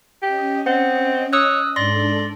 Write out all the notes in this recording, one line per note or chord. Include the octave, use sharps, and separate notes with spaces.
C#4 G4 D#5
C4 F#5
C#5 D#6 E6 F#6
G#2 D4 A4 D5 C6 A#6